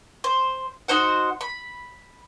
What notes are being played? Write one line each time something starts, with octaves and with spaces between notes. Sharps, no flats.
C5
D#4 F#4 C5 F#5
B5